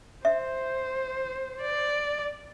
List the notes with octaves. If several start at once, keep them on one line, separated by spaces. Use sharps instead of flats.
C5 E5
D5